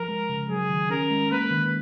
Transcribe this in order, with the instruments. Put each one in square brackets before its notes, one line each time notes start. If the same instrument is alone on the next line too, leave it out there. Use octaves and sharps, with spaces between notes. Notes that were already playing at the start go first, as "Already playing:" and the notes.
Already playing: [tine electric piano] F3 [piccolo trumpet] A#4
[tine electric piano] G#3
C#3
[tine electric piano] F#3 [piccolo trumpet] G#4
[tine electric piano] D#3
[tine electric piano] C#4 [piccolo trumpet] A#4
[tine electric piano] G#3
[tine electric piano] A#3 [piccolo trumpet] B4
[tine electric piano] D#3